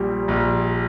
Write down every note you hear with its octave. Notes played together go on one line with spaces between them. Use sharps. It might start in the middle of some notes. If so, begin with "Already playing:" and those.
Already playing: A#1 A#2 G3
A#1